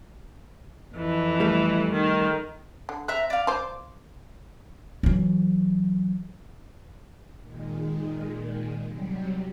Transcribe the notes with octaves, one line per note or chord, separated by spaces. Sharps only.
F2 E3
G3 A3
D#3
D3
C4 E5 A#5 F#6
D5 F5
F4 C5 D6
E3 F#3
A#2 D#3 G#3
C3 F#3 G3